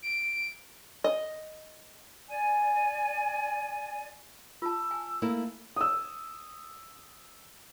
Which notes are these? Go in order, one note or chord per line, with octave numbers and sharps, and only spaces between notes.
D7
D#5
D5 G#5
F4 A5 E6
G#5
A3 A#3 E4
D#6 E6